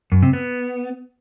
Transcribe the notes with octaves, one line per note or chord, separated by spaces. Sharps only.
F#2
C3
B3